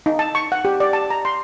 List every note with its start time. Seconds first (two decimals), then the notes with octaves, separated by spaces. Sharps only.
0.06 D#4
0.19 A5
0.35 C#6
0.52 F#5
0.65 G4
0.80 D5
0.93 A5
1.10 A#5
1.25 C6